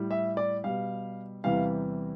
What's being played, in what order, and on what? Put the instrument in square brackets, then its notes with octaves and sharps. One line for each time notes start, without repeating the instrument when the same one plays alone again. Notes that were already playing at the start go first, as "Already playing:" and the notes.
Already playing: [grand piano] A2 G3
E5
D5
B2 G3 F5
E2 C3 E3 G3 F5